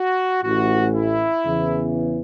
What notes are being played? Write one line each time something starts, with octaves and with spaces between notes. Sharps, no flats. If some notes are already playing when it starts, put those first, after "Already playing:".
Already playing: F#4
A1 A2 E3 F#4
E4
E2 C#3 E3